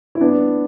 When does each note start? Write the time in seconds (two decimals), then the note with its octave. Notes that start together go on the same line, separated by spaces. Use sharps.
0.15 E4
0.21 B3 D4